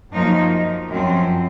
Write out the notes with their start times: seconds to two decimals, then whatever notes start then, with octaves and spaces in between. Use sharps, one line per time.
0.11 F#2 F3 A#3 D#4
0.90 F#2 F3 C4